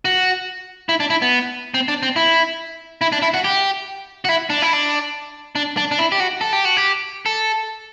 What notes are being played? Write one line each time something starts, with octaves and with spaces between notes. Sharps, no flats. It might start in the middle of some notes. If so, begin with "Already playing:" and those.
F#4
E4
D4
E4
B3
C4
D4
C4
E4
E4
D4
E4
F#4
G4
F#4
E4
D4
E4
D4
D4
D4
D4
E4
G4
F#4
A4
G4
F#4
G4
A4